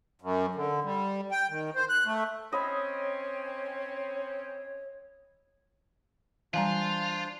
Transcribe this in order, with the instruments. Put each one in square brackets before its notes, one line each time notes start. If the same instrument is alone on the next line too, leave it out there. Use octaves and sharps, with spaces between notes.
[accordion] F#2
D3
G3
G5
D#3
C5
F#6
A3
[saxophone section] C4 C#4 [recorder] C#5 [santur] D#5 B5 E6
[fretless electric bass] E3 G3 [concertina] D4 C5 [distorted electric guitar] F4 [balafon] F5 G#5 A#5